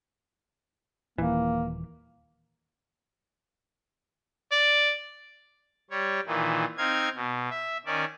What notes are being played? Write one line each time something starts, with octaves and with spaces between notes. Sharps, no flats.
D#1 E3 A#3
D5
G3 C#5
A#2 D#3 E3
C4 D#4 F5 G#6
B2
E5
D#3 C#4 D5